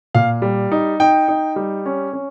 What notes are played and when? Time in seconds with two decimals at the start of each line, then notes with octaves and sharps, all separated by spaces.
0.15 A#2 F5
0.42 G3
0.72 D#4
1.00 D#4 G5
1.28 D#4
1.56 G3
1.86 C#4
2.13 C#4